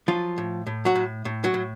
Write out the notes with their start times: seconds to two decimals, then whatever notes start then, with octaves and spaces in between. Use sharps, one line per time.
0.08 F3 F#3 F4
0.38 A2
0.67 A2
0.85 F#3 F#4
0.95 A2
1.25 A2
1.44 F#3 F#4
1.54 A2